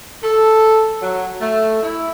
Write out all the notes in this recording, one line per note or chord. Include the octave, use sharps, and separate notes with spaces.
A4
F#3
A3
E4